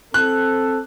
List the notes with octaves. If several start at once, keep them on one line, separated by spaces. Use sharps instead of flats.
C4 A4 F#6